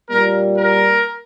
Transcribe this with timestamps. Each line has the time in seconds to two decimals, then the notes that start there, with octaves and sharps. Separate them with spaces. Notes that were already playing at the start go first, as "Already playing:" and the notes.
0.09 A#2 G3 A#3 A#4
0.57 A#4